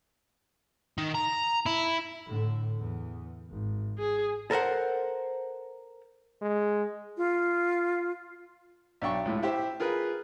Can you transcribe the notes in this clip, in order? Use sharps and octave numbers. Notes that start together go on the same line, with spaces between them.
D#3
A#5
E4
A2 D3
E2
G#1
G#4
A4 A#4 C5 F#5
G#3
F4
B1 D4 G5 C#6
C#2 A2
E4 G4 C5 E5
F4 G#4 A#4 B4